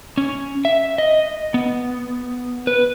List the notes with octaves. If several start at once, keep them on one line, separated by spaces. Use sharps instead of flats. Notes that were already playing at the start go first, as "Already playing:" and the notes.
C#4
E5
D#5
B3
B4